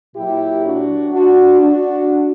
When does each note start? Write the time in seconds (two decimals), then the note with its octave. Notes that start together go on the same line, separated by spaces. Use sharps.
0.15 A#2 F#3 E4 G4
0.63 D4 F#4
1.12 D4 F#4
1.61 D4 F#4